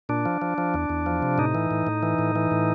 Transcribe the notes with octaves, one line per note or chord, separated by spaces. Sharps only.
A#2 D4
F3
F3
F3
E2
E2
F3
C3
A2 D#4
E3
A2
A2
E3
A2
E3
A2